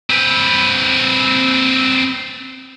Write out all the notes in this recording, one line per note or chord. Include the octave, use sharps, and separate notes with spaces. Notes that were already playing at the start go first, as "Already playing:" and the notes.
C4 B4